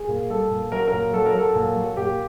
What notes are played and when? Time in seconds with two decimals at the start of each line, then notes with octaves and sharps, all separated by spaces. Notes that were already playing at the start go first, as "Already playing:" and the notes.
Already playing: G#4
0.08 A#2
0.30 G3 A4
0.51 A#2
0.72 F#3 A#4
0.88 A#4
0.93 A#2
1.13 F#3 A4
1.26 A#4
1.34 F#3 A4
1.55 A#2
1.76 F#3
1.97 A#2 G4